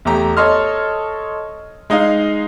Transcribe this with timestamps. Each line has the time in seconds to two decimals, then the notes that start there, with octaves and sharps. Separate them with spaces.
0.05 E2 A3 G4 A#5
0.37 A4 C#5 D#5 C6 F6
1.90 G#3 D#4 D#5 F5